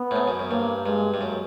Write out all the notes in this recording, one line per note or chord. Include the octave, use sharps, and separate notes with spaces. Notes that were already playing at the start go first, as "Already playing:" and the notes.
Already playing: B3
A2
G#2
F#2
F#2
G2 A#3
G2 G#3
G2
F#2